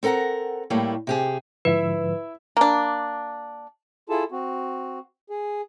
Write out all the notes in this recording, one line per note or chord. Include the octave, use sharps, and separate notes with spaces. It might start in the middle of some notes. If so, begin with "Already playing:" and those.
C4 A4 A#4 F#5 A#5
A2 G3 A3 A#3 E4
C3 G4 G#4
G#2 D3 F3 E4 B4 E5
A#3 D4
E4 F4 G#4 A4 A5
C4 F#4
G#4